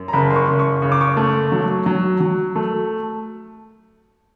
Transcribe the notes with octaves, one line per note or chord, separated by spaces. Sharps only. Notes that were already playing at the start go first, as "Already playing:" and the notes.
Already playing: F#2
A#5
F#1 B5
C6
C#6
F#1
C#6
C#3 C#6
D6
C#6
A3
F#3
F#3
F#3
A3